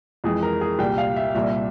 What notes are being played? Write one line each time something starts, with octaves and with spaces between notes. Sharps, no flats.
F2 E3 G#3 G#4
A#4
G#4
C2 A#2 G3 G5
F5
E5
C2 A#2 G3 E5